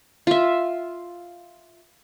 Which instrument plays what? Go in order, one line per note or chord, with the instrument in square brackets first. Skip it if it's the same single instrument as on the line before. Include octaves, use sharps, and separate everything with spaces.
[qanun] F4 E5